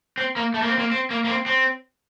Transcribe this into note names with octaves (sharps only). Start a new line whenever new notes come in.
C4
A#3
A3
A#3
C4
A#3
C4
A#3
A#3
C4
C4